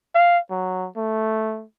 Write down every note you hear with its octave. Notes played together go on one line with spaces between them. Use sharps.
F5
F#3
A3